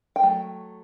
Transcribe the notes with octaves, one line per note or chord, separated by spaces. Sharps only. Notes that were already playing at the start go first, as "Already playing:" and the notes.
G5
F#3 A3